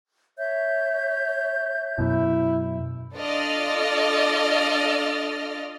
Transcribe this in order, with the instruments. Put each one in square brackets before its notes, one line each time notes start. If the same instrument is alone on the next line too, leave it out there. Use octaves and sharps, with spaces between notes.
[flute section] C#5 E5 G6
[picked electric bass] F#2 B2 [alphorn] E4
[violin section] D4 F4 A4 D5 D#5 F6